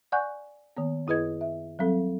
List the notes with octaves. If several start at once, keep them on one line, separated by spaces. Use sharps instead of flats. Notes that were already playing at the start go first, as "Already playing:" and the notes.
D5 F#5 G#5 C#6 F#6 G6
D#3 A#3 B3
F#2 E4 G#4 B4 D#5 G#6
E5
F#3 G3 C4 A4